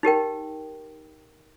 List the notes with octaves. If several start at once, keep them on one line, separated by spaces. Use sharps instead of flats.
D#4 G4 A#4 G5